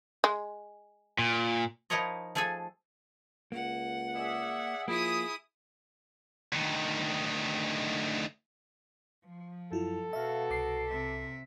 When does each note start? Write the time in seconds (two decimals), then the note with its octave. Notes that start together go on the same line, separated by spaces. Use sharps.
0.24 G#3
1.19 A#2
1.90 F3 D#4 E4 A#4 C#5 D#5
2.35 F3 A3 G#4 A4 G#5
3.52 C#2 A#3 F#5
4.16 G#4 D5 E5
4.88 F3 A#3 E4 G#4 D#6
6.53 D2 D#3
9.25 F3
9.72 F#2 E4 F4 A4
10.13 B2 F#4 E5 F5
10.50 C2 D6 C7
10.88 C3 E5